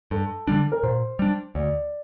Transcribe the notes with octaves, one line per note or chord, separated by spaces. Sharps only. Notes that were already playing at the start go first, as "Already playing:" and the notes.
G2 A4
D3 G3 D4
A#4
A#2 C5
G3 D4
D2 D5